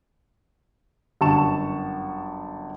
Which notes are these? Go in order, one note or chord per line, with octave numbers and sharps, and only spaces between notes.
G1 F#2 A5 C#6 E7